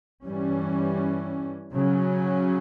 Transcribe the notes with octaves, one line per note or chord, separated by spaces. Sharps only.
G2 E3 G3 C#4
C#3 F#3 C#4